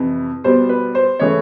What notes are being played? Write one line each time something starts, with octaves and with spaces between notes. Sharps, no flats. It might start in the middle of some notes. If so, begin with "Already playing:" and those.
Already playing: F2 C3 E3
B2 G3 B3 C5
B4
C5
C#3 E3 A3 C#5